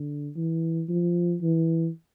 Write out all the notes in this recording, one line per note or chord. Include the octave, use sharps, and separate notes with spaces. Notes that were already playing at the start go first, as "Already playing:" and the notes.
Already playing: D3
E3
F3
E3